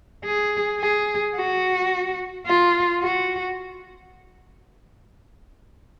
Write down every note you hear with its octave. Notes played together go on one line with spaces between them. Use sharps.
G#4
G#4
F#4
F4
F#4